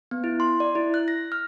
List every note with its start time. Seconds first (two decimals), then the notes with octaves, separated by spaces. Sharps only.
0.11 B3
0.24 E4
0.40 C6
0.60 D5
0.75 E4
0.94 F#6
1.08 A#6
1.32 F6